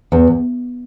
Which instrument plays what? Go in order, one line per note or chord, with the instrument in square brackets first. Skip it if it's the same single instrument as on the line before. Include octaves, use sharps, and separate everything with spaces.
[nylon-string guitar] E2